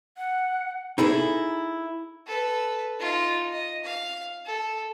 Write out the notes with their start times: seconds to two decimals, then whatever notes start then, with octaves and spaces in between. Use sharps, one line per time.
0.18 F#5
0.98 D#4 E4 G#4 A4
2.27 A4 B4
3.00 D#4 F4
3.51 D#5
3.84 F5
4.46 A4